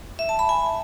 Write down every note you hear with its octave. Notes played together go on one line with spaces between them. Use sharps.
E5
A5
B5
G#5